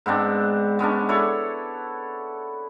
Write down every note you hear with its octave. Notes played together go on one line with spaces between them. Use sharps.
G#2 B3 C4 D4
G#3 B3 C#4 D4
E4 A4 C#5 D5